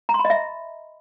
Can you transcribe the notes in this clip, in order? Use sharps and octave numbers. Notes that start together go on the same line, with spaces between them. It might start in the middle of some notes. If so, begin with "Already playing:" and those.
A#5
C6
B5
D#5
E5